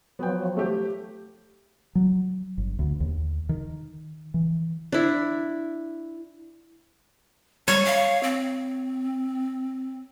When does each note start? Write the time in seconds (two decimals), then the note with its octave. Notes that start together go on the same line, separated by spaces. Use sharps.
0.19 F3 F#3 B3 G5
0.57 A3 G4
1.95 F#3
2.58 G1
2.79 D2
3.00 D#2
3.49 D#3
4.34 E3
4.92 D4 E4
7.68 G3 C#5
7.85 F5
8.23 C4